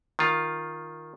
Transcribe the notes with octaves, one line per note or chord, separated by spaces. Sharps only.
D#3 F4